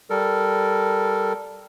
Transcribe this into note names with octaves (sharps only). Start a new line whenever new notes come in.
G3 A4 A#4